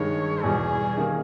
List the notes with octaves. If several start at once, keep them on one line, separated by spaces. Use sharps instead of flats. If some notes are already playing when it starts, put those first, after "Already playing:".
Already playing: G2 D#3 G#3 C#5
E2 B2 G3 G#4
D#3 A#3 D#4